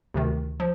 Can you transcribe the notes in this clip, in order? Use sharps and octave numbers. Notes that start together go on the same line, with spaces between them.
D2 C3 D#3
F3